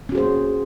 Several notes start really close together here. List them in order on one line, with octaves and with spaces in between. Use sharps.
C#4 F#4 G#4 C5 A#3